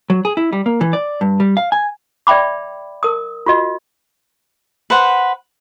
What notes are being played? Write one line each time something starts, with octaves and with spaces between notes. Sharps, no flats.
F#3
G#4
E4
G3
A#3
E3
D5
G2
G3
F5
G#5
D5 E5 G5 B5 D6
A#4 D#6
F4 F#4 D#5
B4 C5 F#5